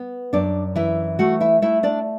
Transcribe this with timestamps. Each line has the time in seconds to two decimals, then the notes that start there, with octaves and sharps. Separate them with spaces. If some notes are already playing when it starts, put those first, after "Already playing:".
Already playing: B3
0.33 F#2 D4 D5
0.76 E3 E4 E5
1.19 A3 F#4 F#5
1.41 E4 E5
1.62 A3 E4 E5
1.83 D4 D5